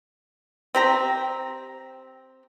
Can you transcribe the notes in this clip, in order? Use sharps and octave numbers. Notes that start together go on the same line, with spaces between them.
C4 G4 A#5